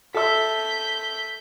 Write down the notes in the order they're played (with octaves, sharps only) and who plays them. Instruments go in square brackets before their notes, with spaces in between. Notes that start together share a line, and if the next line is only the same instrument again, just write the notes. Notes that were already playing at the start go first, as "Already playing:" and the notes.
[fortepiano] A4 E5 [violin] G6 B6